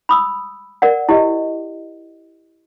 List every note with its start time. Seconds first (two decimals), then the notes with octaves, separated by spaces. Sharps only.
0.09 B5 D#6 E6
0.82 A#4 D5 F#5
1.09 E4 G4 D#5